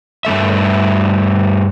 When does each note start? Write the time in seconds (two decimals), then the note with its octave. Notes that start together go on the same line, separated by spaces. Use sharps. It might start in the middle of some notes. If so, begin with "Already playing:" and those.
0.25 G2 G#3 A3 E5